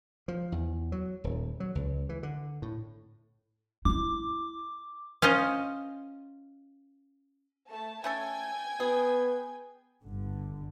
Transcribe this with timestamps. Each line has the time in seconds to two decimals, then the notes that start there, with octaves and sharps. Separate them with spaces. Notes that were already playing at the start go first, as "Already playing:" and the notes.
0.28 F3
0.52 E2
0.92 F#3
1.24 D#1
1.60 F#3
1.75 C#2
2.09 E3
2.23 D3
2.62 A2
3.85 D#4 E4 D6
5.22 C#4 F4 C5 D#5
7.69 A3 A4 A5
8.04 A3 C#4 A4 G5 G#5 G#6
8.80 B3 G#4
10.03 G1 D3